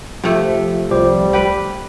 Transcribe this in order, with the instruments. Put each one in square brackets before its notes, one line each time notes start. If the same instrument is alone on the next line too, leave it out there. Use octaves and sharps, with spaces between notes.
[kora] C3 A3 [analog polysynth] F3
[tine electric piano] C2 C5 D6 [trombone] G3
[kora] G4 B4